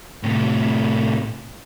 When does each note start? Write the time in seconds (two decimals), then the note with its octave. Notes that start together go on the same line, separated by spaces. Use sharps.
0.23 A2 C3